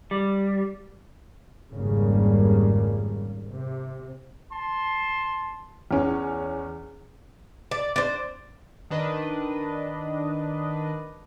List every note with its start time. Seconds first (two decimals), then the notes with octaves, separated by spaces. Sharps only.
0.11 G3
1.72 G#1 F2 C#3 G3 A#3
3.50 C3
4.52 A5 C6
5.91 E2 C#4
7.71 D5
7.96 D4 C5
8.90 D#3 D4 B4 D#5